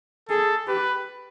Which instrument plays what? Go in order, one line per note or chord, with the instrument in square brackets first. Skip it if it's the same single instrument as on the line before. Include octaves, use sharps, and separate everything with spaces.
[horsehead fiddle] G#4 [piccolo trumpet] A4
[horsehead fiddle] G4 [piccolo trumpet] B4